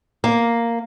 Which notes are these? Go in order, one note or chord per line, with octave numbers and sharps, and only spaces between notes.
A#3